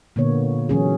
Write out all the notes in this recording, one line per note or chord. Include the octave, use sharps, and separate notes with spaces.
A#2 D3 A#3 B3 C#5
E3 F#3 C#4 G#4